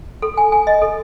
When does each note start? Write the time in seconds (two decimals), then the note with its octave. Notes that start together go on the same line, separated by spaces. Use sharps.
0.22 A4
0.37 G#5
0.52 G#5
0.67 D#5
0.82 A4